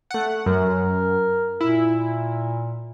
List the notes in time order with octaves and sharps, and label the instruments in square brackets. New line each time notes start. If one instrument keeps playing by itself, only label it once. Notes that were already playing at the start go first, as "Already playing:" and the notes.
[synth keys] A3 F#5
[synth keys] F#2 [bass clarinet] A#4
[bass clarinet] A#2 [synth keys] E4